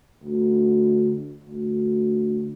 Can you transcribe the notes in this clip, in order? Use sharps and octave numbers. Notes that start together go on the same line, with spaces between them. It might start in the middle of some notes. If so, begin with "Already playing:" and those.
D2
D2